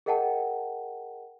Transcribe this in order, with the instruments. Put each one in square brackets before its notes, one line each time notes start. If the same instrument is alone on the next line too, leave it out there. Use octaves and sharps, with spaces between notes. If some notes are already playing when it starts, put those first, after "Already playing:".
[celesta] G#4 A#4 D#5 F#5 G5 A5